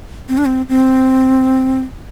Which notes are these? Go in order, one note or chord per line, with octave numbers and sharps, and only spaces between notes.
C4
D4
C4
C4